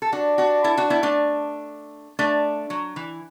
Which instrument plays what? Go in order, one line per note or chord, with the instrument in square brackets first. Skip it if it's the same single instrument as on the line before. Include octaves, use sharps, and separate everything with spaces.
[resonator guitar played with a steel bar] A4
D4 F#4
D4 F#4
E4 A4
D4 F#4
B3 E4
A3 D4
A3 D4
F#3
E3